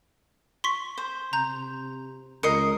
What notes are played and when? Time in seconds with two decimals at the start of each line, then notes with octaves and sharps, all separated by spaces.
0.64 C6 C#6 B6
0.97 C5
1.33 C3 A#5 G6
2.43 C#2 A#4 D#5 C7 C#7